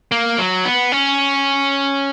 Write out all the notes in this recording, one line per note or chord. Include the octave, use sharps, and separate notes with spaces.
A#3
F#3
B3
C#4